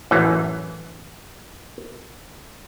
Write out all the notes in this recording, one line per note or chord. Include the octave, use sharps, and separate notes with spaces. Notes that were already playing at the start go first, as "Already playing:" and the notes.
A1 F#2 E3